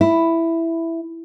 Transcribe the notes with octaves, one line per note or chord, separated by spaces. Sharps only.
E4